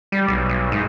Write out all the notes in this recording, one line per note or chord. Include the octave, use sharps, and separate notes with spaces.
G3
B1
B1
G#2